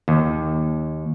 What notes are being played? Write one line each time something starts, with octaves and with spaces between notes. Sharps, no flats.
D#2